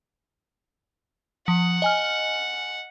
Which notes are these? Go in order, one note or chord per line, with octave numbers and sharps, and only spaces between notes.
F3 F#5
D#5 G#5 F6